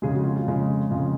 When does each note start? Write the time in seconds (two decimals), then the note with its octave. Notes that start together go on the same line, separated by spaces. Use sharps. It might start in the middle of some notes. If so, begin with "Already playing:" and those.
0.02 F2 C#3 G#3 G#4
0.14 F#4
0.24 F4
0.36 F4
0.46 F2 C#3 G#3
0.90 F2 C#3 G#3